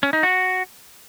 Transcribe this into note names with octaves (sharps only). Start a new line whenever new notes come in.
C#4
D#4
F#4